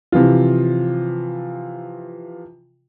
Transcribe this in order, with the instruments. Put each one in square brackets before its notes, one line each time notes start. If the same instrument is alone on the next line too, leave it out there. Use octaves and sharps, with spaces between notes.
[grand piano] C3 E3 F3 F4